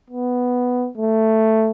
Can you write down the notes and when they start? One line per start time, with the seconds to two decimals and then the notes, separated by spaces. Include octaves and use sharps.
0.10 B3
0.97 A3